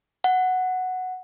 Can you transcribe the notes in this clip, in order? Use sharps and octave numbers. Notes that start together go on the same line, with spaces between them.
F#5